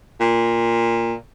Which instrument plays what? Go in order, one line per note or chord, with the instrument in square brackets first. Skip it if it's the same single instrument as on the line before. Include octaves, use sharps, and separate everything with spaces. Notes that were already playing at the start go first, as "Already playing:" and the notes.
[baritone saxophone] A#2